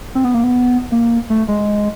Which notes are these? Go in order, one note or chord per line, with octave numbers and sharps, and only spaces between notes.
C4
B3
A#3
B3
A#3
A3
G#3